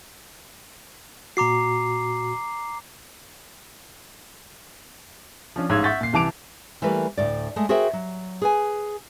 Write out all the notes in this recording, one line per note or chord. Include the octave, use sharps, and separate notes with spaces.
A#2 F#4 A#5 D6 C7
F3 C#4 D4
A1 G#2 C#4 F5 E6 G#6
E5 F#5 C#6 G6 A6 B6
A#2 C7
C2 E3 A5 D6 D7 F7
E3 G3 A3 A#3 B4
D2 A2 D5
G#3 A3
F#4 G#4 A#4 C5 E5 G5
F#3
G#4 B4 G#5